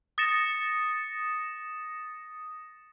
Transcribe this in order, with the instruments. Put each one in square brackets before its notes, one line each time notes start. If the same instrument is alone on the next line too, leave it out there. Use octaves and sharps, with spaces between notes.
[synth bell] D#6 A6 A#6 C#7 E7